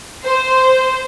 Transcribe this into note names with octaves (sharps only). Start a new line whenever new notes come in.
C5